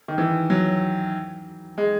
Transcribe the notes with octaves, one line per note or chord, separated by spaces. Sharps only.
D#3
E3
F#3
G#3